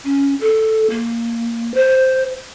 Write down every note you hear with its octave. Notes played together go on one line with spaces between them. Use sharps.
C#4
A4
A#3
C5